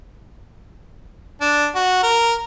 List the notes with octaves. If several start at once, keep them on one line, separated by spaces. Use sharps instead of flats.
D4
F#4
A#4